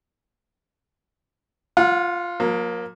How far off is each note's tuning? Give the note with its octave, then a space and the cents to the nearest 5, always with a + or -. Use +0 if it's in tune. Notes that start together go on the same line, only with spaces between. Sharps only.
F4 +0 F#5 -40
F#3 -45 A#3 +15